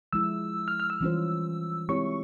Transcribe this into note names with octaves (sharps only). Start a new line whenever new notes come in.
F3 G#3 E4 E6
F6
F6
E6
E3 G3 C#4 F4 C5
G#3 C4 E4 G4 C#5 C#6